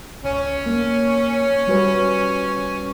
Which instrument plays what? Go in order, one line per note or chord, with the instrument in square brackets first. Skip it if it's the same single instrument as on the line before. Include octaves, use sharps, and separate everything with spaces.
[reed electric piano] C#2 [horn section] C#4
[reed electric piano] A#3
G3 F#4 B4